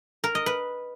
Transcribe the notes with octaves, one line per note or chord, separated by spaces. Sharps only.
A#4
D#5
B4